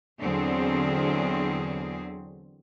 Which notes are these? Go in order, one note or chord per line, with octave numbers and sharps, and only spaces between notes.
E2 D3 F#3 C4 G#4